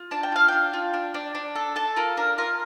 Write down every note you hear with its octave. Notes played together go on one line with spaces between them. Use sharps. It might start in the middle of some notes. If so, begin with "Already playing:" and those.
Already playing: F4
D4 A5
G5
F4 F5
D4 G5
F4
D4
D4
D4
A4
A4 A5
F4 A#4
D4 A#4
F4 A#4